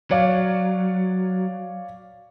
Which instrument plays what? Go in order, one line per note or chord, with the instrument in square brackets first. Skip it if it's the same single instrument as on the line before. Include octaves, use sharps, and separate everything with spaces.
[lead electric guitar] F#3 [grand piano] C#5 D5 F5